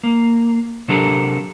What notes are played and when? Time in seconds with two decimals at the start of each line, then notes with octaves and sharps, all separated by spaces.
0.03 A#3
0.88 C3 F#3 D4 G4 A4 A#4